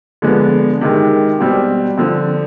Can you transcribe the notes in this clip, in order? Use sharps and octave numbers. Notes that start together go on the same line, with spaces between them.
D3 F3 G#3 B3
C3 D#3 G#3
B2 G3 C4 G4
D3 F3 C4